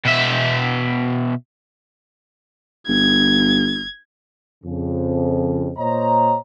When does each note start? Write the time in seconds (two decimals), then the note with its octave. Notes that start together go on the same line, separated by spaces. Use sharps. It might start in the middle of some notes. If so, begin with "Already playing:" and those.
0.05 B2 E5
2.88 G1 G#6
4.65 F2 C#3
5.77 A#2 C5 C#5 D#5 A#5